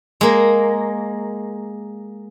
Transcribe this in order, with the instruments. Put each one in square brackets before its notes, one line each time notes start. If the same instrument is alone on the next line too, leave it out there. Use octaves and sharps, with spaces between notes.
[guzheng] G#3 A#3